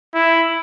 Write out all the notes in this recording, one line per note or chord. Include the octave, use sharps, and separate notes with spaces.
E4